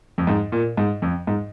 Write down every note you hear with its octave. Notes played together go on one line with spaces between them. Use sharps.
F2
G#2
A#2
G#2
F2
G#2